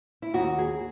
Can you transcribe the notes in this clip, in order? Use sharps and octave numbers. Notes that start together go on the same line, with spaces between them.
E4
D#2 F#4
G#4